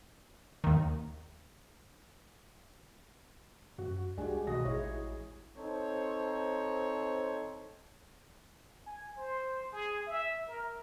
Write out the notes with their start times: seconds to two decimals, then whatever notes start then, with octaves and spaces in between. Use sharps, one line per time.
0.64 D#2 D#3
3.78 F#2 F#4
4.17 C2 G#3 D4 F#4 G4 G#5
4.47 G#1 B2 F#4 D#5 A#6
4.65 A1 E4 G#4 C#5
5.57 C4 D#4 A4 C5 C#5
8.87 G#5
9.17 C5
9.73 G#4
10.07 E5
10.48 A#4